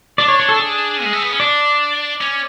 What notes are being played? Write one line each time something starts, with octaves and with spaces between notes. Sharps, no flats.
D4 D5
C#5
C#5
A4
G#4
G#3
A3
B3
C#4
D4 D5
C#4